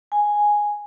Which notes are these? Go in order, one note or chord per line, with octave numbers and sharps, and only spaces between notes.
G#5